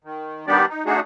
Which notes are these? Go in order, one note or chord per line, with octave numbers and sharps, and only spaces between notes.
D#3
D#3 G3 B3 D4 G4 D5
D#4
A3 D4 D#4 F#4 G#4